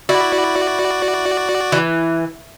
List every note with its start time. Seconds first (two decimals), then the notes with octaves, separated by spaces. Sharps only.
0.09 E4 F#4 D5
1.72 E3